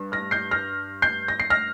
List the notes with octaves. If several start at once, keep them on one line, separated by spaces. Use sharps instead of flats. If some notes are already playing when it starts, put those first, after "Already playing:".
Already playing: G2
F6 A#6
G6 C7
F6 A#6
G6 C7
A#6
C7
F6 A#6